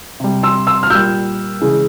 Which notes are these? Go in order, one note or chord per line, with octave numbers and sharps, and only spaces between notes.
C3 G3
C6 E6
C6 E6
F6
A#2 G3 E6 G6
C#3 E3 G#3